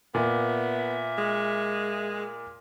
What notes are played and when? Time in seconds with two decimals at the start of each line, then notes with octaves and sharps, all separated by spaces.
0.14 A#2 B3 E5
1.18 G#3